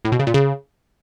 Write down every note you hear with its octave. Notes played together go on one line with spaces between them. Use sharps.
A2
B2
C#3
A#2
C#3